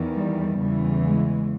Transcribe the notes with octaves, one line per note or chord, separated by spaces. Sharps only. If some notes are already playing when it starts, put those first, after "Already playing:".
Already playing: E2 D#3
G3
E2 C#3 E3 G3
G#3